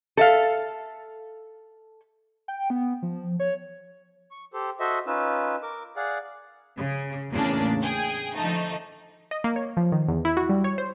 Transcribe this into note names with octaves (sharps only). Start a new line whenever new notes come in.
A4 E5 F5
G5
B3
F3
C#5
C#6
G4 A4 C5
F#4 A4 C5 D#5 E5
C#4 D#4 F4 B4 E6
A#4 D6
G#4 D5 F5 F#5
C#3
E2 A2 C#3 A#3 D4
G#4 G5
D3 F3 A3 D#4
D#5
A#3
C#5
F3
D#3
E2
E4
F#4
G3
C#5
C5